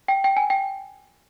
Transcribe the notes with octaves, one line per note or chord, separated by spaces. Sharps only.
G5
G5
G#5
G5